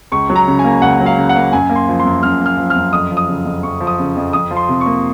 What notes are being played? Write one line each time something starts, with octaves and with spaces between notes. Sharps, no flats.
C#2 C#6
F#3
A#5
C#3
G#5
A#3
C#2 F#5
F#3
F5
C#3
F#5
A#3
F#2 G#5
A#3
C6
F3
C6
F#2
F#2 F6
A#3
F6
F3
F6
F#2
F2 D#6
F3
D#6
C#3
F2
F2 C#6
F3
D#6
C#3
F2
F2 D#6
F3
C6
C3
A#3 C#6